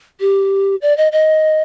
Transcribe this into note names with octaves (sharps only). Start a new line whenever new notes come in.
G4
D5
D#5
D#5